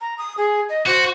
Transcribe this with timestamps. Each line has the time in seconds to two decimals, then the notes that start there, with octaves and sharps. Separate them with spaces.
0.01 A#5
0.18 D#6
0.37 G#4
0.69 D#5
0.87 F#4 C5